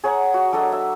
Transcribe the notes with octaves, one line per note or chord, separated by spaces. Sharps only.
G#4 C#5 F#5 A#5
F#4
F#3 D4 A4 D#5
E5